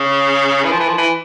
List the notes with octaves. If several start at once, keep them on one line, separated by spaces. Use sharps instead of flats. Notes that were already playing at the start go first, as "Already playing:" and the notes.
Already playing: C#3
E3
F3
E3
F3
E3